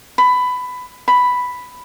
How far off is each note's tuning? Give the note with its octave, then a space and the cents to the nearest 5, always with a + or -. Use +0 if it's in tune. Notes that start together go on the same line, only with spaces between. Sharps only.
B5 +15
B5 +5